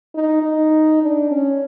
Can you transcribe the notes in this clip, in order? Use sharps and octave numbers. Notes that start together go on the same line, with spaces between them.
D#4
D#4
D4
C#4